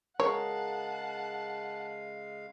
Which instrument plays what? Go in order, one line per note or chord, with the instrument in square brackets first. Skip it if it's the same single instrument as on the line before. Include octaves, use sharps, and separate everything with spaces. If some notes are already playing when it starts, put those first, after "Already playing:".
[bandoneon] C#3 G#3 F5 [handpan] G#4 A#4 [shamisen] C#5 [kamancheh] F#5 A5